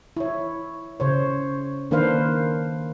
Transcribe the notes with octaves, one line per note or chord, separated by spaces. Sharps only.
E4 C#5
C#3 C5 C#5
D#3 A#3 D4 B4 C5 F5